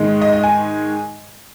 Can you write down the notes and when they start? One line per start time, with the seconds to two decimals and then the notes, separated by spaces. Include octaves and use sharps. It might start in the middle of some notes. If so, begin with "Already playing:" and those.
Already playing: G#2 D#3 G#3
0.21 D#5
0.33 D#5
0.44 G#5